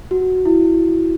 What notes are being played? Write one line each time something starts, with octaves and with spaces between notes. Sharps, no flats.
F#4
E4